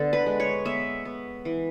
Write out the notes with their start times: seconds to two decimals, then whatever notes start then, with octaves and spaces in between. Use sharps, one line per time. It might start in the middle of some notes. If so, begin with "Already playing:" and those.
Already playing: D3 B3 A4
0.13 B4
0.26 G#3
0.40 C#5
0.65 B3 E5
1.05 B3
1.45 E3